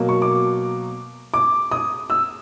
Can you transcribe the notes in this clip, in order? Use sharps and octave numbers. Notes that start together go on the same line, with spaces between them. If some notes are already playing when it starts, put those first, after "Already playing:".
Already playing: B2 F#3 A#3
C#6
D6
D6
D#6
E6